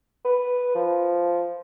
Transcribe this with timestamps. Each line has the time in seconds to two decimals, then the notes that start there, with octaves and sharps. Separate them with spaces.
0.25 B4
0.75 F3